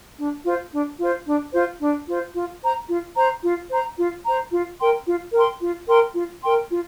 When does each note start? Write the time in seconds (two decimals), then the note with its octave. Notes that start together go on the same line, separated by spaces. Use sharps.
0.17 D4
0.44 F4 C5
0.71 D4
0.98 F4 C5
1.26 D4
1.53 F4 C5
1.80 D4
2.07 F4 C5
2.34 F4
2.62 C5 A#5
2.88 F4
3.16 C5 A#5
3.43 F4
3.70 C5 A#5
3.97 F4
4.25 C5 A#5
4.51 F4
4.79 A#4 G5 C6
5.06 F4
5.33 A#4 G5 C6
5.60 F4
5.88 A#4 G5 C6
6.14 F4
6.42 A#4 G5 C6
6.69 F4